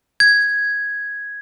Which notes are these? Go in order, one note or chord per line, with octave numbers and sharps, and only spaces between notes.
G#6